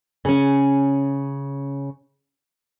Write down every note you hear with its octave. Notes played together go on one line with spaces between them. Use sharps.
C#3 C#4